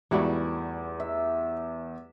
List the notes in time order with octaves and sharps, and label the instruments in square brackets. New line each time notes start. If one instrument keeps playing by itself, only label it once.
[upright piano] E2 [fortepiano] G#2 E4 F#4 [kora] E3 G3 A3
[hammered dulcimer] E5